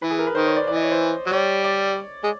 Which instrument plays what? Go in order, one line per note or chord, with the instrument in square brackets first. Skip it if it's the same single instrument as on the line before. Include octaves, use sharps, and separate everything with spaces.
[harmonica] E3 [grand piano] B4
[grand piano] G#4
A#4
B4
[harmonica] D#3 [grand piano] C5
[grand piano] C#5
D5
[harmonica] E3 [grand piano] D5
[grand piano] D#5
C#5
C5
[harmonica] F#3
[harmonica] G3 [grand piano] C#5
[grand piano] D5
[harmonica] G#3